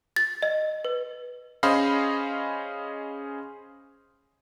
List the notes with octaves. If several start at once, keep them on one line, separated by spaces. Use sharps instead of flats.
A6
D#5
B4
C#4 G#4 C5 D#5 F5 B5